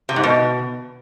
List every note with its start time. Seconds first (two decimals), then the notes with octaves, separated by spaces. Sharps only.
0.09 C3
0.16 G#2
0.24 B2